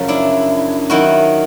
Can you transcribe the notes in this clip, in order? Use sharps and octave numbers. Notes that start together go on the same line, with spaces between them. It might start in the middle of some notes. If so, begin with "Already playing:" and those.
Already playing: F#2 C#3 F3
D4 E4
D#3 F#3 E4 F#4